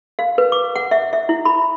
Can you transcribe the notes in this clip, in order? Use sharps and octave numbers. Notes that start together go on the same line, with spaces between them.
F5
B4
D6
F#5
E5
E5
E4
B5